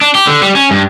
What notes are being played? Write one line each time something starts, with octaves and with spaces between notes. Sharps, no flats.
D4
G4
D3
G3
C#4
G2